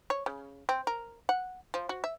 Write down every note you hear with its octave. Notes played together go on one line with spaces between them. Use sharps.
C#5
C#3
C4
A#4
F#5
F3
F#4
E5